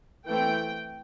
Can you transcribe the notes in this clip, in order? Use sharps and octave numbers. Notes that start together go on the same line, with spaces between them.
E3 A3 C4 G5